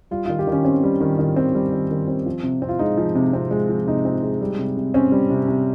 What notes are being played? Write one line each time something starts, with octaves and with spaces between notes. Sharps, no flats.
G3 F4
D#3 F4
G4
D#3
C#4
C4 C#4
G3
D#3
D#3
C4
G3
D#3
D#3
C4
F3
C3
C4
F4
G#3 D#4
F3
C3
C4
G#3
F3
C3 D#4
C4
G#3
G3
C3
C3
C4 C#4
G3
C3
C3